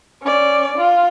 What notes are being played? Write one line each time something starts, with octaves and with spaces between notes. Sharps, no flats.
C#4 D5
F4